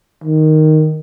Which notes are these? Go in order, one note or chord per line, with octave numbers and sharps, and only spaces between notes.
D#3